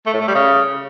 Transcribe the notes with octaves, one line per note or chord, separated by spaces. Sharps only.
A3
A2
A3
G3
C#3